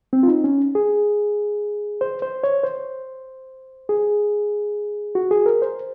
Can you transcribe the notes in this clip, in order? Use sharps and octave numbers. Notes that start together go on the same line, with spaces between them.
C4
F4
D#4
C#4
G#4
C5
C5
C#5
C5
G#4
F#4
G#4
A#4
C5